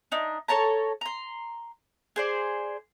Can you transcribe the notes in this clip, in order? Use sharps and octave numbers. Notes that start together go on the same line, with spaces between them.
D4 D#4
A4 C#5 A5 A#5
A#5 C6
G#4 C5 D5